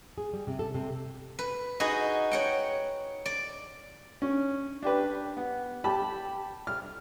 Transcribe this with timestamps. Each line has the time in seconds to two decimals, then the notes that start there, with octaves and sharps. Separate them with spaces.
0.18 G#4
0.33 G3
0.47 C3
0.59 A4
0.75 C3
1.39 B4
1.80 D#4 F#4 G#4 B4 D#5
2.31 C#5 F#5 G5
3.26 D5
4.22 C#4
4.83 D4 G4 B4
5.37 B3
5.84 G4 A5 B5
6.67 F6